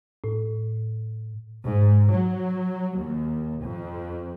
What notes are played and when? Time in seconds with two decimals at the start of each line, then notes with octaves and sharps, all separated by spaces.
0.24 A2
1.65 G#2
2.12 F#3
2.98 D#2
3.64 F2